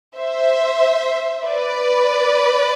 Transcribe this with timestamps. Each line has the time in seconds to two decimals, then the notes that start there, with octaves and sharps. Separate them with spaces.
0.17 C5 E5
1.46 B4 D5